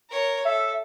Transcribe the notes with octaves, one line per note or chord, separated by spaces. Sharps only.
A#4 C#5
A4 E5